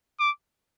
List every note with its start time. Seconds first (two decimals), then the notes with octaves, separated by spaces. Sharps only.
0.19 D6